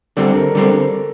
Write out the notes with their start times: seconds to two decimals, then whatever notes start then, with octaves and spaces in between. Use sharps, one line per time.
0.17 D3 G3 C4 A4
0.36 A#4
0.55 D3 G3 C4 A4